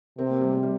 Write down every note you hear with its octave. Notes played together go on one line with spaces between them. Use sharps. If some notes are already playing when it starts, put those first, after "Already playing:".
C3 C4
A#3
G3
G3
G3